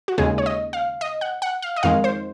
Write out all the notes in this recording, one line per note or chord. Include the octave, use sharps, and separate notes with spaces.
F#4
D#2 C#3 G#3 G#4
C#5
D#5
F5
D#5
F#5
F#5
F5
D#5
F2 D#3 G#3 F5
C5